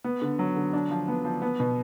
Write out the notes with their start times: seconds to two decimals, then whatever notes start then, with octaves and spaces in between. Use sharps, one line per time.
0.04 B3
0.22 D3
0.39 F#3
0.57 D3
0.73 D4
0.91 F3
1.08 B3
1.25 F3
1.42 B3
1.60 B2